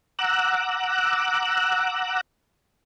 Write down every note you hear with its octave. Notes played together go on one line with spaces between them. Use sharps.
F#5 A#5 D6 E6 F#6